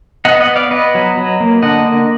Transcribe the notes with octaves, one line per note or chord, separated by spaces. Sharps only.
B3 D#5 F#5
D#5 F#5
B3
D5 F5
B3 B4 D#5
F#3
F#3
A#3
D3 D#5 F#5
A#3